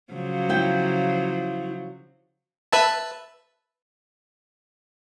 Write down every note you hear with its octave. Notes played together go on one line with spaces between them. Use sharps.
C#3 F3 F#3
E4 G5
B4 E5 A5